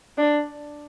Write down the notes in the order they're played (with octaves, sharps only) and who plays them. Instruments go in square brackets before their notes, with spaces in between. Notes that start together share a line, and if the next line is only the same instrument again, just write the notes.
[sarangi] D4